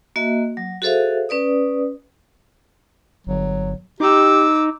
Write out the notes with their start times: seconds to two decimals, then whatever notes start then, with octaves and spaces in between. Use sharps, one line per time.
0.16 A#3 F#4 D#5 E5
0.57 F#3
0.82 F#4 G#4 A4 C5 E5 F5
1.29 C#4 B4 D5 D#6
3.27 G1 F#3
4.00 D#4 G4 D6 E6